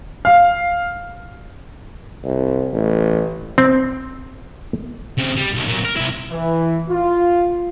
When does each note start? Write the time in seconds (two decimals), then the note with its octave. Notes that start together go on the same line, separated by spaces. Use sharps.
0.25 F5
2.24 C2
2.73 A1
3.58 C4
5.18 C#3 C4
5.37 G3
5.54 B1 D#3
5.67 A#2 F#3
5.85 A#4
5.97 C3 E4
6.31 E3
6.90 F4